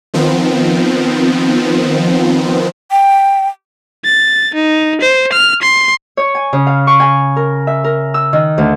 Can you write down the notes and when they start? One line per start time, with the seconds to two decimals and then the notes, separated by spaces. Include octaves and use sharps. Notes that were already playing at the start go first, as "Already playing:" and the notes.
0.14 D#3 F3 B3 C4
2.91 G5
4.05 A6
4.55 D#4
5.01 C5
5.33 F6
5.62 C6
6.17 C#5
6.35 G#5
6.53 C#3
6.67 F5
6.87 C#6
7.00 G#5
7.36 A#4
7.67 E5
7.84 A#4
8.14 E6
8.33 D#3
8.58 D2